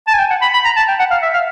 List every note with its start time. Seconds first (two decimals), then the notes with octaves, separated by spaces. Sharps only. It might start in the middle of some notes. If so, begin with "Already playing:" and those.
0.07 A5
0.14 G#5
0.19 G5
0.30 F#5
0.42 B5
0.53 B5
0.65 A#5
0.76 A5
0.88 G5
0.99 F#5
1.11 F5
1.22 E5
1.34 F5